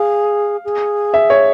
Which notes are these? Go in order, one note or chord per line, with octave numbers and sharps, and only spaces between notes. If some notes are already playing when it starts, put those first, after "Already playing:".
Already playing: G#4 F5
G#4
E5
C#5